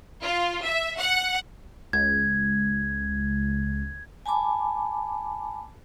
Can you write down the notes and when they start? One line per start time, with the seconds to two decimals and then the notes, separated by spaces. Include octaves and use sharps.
0.23 F4
0.63 E5
0.98 F#5
1.93 C#2 G#6
4.26 G#5 A5 B5 D6